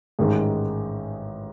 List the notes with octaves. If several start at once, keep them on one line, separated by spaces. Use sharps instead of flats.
A1 G#2 D#3 G#3